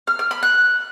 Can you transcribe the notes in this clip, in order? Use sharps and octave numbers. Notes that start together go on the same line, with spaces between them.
F6
F6
B5
F#6